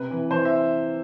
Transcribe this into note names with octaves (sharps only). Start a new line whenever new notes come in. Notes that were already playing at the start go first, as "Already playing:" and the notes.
Already playing: C3 B4
E3
E3 C5
E5